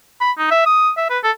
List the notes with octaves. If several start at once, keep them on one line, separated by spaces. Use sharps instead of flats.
B5
D#4
E5
D#6
E5
B4
A4